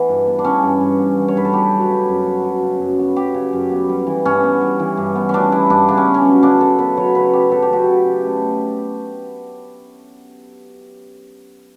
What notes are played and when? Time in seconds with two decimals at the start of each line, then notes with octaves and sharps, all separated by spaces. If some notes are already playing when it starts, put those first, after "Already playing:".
Already playing: E3 B3
0.09 G2
0.26 B3
0.39 D4
0.44 E3 C#4
0.62 G2
0.81 G2
0.99 B3
1.17 E3
1.28 C#5
1.35 G2 B4
1.45 A4
1.53 B3 G4
1.71 F#3
1.80 B4
1.89 C#3
2.08 F#2
2.26 B3
2.44 F#3
2.62 C#3
2.80 F#2
2.99 B3
3.16 F#3 G4
3.34 C#3
3.53 F#2
3.71 B3
3.89 G3
4.07 E3
4.25 G2 C#4
4.43 B3
4.62 G3
4.79 E3
4.97 G2
5.15 B3
5.29 G3 C#4 D4
5.52 E3 E4
5.70 G2 D4
5.88 C#3 D4
5.97 C#4
6.07 B3
6.14 C#4
6.25 F#3
6.43 C#3 D4
6.61 C#3 A4
6.79 B3 B4
6.97 F#3 C#5
7.15 C#3 B4
7.33 C#3 G4
7.52 B3 A4
7.62 G4
7.70 F#3 F#4
7.84 C#3 G4
8.06 C#3
8.25 A3